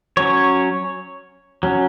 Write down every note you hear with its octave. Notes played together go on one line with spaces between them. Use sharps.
F#3 C#4 C#5
F#3 C#4